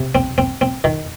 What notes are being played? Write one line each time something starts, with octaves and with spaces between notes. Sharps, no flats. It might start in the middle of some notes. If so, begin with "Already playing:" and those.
Already playing: C3
C4
C4
C4
D#3